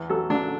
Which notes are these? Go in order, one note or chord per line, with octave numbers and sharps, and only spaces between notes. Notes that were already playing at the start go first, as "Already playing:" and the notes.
Already playing: E2
F#3 A4
D3 D4